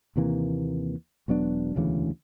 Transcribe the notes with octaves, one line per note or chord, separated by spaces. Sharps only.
D#2 C3 E3 A#3
E1 F#3 B3 D4
E1 D2 C#3 E3